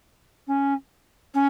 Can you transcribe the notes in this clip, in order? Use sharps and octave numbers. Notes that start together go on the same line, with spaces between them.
C#4
C#4